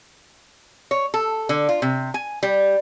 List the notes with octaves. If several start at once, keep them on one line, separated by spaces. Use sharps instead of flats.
C#5
A4
D3
F4
C3
G#5
G3